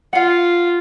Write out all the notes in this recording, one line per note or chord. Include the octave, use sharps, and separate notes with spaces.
F4 F5 F#5